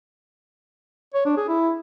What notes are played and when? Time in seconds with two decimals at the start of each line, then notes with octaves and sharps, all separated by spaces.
1.14 C#5
1.26 D4
1.37 G#4
1.48 E4